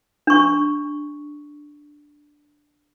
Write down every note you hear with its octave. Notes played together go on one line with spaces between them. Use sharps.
D4 C#6